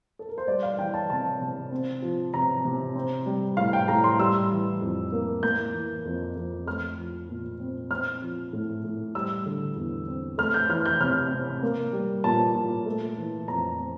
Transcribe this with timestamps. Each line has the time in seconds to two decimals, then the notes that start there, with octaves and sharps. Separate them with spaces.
0.19 A4
0.29 A#4
0.38 C5
0.48 G3 D5
0.63 F5
0.78 E3 G5
0.94 A5
1.10 C3 A5
1.41 C3
1.71 C4
2.02 F3
2.33 C3 A#5
2.65 C3
2.96 C4
3.26 G3
3.57 A2 F5
3.73 G5
3.88 A2 A#5
4.04 C6
4.19 G3 E6
4.51 E3
4.81 F2
5.12 A#3
5.43 A#3 G6
5.73 E3
6.05 F2
6.36 F2
6.67 A3 F6
6.98 F3
7.29 A#2
7.60 C4
7.91 C4 F6
8.22 F3
8.53 A2
8.84 A2
9.15 G3 E6
9.46 D3
9.76 E2
10.07 C4
10.38 A3 F6
10.54 G6
10.69 E3 F6
10.85 G6
11.00 C3 F6
11.32 C3
11.63 A#3
11.93 G3
12.24 A#2 A5
12.55 A#2
12.86 A3
13.18 E3
13.48 F2 A#5
13.80 C4